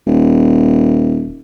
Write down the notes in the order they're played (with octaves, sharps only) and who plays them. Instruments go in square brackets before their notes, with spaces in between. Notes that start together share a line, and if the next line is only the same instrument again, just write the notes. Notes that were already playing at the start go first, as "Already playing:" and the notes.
[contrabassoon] D#1